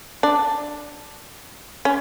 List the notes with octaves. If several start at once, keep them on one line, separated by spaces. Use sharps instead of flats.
D4
C#4